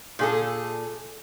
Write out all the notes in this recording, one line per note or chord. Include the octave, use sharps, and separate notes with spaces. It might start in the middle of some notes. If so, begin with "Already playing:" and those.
A#2 G#4 A4